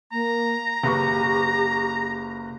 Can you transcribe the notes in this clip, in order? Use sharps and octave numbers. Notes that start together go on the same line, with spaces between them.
A#3 A#5
F#1 G4 B4 C#6